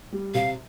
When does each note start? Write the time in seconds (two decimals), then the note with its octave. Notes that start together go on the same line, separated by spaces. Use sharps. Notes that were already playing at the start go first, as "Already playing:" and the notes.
0.12 G3
0.34 C3 F5